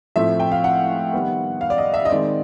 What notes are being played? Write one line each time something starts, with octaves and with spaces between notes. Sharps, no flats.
A2 F3 A3 C4 E5
G5
F5
F#5
D#3 G3 B3
F5
D5
D#5
E5
D#5
D#3 G#3 C4 D5